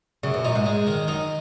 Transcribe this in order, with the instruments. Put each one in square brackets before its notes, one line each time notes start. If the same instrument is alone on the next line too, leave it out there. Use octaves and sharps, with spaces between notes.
[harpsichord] F#2 [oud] C#3
[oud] B2
[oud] A#2 [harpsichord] D#4
[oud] G#2
[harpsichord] G#3
D#3
[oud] F#2 [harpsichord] D#4